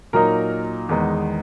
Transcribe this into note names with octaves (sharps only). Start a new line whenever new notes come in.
A#2 F#3 A#3 D#4 A#4
E2 D#3 G#3 B3 D#4